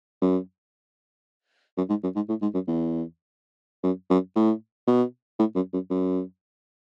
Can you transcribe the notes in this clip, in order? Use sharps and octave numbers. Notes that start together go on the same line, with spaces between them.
F#2
F#2
G#2
F#2
G#2
A2
G#2
F#2
E2
F#2
F#2
A2
B2
A2
F#2
F#2
F#2